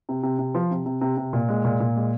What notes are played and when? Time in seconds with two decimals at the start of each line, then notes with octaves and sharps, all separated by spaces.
0.09 C3
0.23 C3
0.39 C3
0.55 F3
0.71 C3
0.86 C3
1.01 C3
1.17 C3
1.33 A#2
1.49 G#3
1.65 A#2
1.80 A#2
1.96 G#3